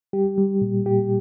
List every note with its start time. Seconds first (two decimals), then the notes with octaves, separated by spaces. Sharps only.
0.13 G3 G4
0.38 G3
0.62 A#2
0.86 A#2 G4